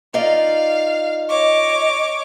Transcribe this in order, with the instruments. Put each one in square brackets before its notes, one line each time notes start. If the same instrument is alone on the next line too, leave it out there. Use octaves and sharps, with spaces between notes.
[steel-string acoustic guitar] D#4 F4 D5 [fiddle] F5
[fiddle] C#5 D6 [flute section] D#5